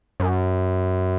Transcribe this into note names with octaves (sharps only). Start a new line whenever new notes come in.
F#2